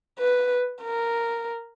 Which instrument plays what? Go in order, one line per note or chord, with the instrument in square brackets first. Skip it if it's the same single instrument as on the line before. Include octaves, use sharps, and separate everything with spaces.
[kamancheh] B4
A#4